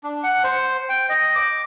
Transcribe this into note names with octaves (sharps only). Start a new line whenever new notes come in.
D4
F#5
C5
G5
D#5
D6